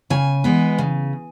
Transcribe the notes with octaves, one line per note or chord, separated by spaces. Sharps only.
C#3 G#5
E3 G#3 B3
C#3